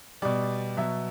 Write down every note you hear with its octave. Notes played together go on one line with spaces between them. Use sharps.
B2 G3 D5
B2 F#3 E5